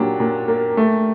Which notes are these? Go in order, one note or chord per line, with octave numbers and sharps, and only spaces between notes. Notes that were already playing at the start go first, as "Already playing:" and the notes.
Already playing: A#2 F#3 D4 G4
A#2
A#3
A3